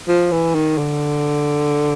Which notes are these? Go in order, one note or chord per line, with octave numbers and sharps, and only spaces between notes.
F3
E3
D#3
D3